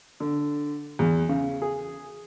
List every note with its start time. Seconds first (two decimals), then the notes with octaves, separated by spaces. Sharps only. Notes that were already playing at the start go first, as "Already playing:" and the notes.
0.20 D3
0.99 E2
1.29 C#3
1.62 G#4